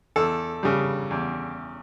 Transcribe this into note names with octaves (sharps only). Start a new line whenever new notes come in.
E2 A4
C#3 G3
E2